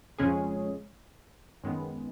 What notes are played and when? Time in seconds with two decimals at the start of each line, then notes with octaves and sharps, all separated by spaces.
0.18 F2 C#3 G#3 C#4 G#4
1.64 F#2 D#3 G#3 B3